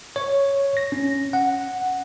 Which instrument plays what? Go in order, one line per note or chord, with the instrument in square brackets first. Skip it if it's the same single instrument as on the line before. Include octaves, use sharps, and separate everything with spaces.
[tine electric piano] C#5
A#6
C#4
F#5